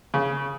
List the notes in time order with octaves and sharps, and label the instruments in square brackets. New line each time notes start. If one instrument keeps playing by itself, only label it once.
[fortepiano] C#3